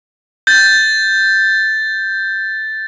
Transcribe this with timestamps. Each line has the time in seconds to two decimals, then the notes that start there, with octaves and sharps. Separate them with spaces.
0.47 G6 A6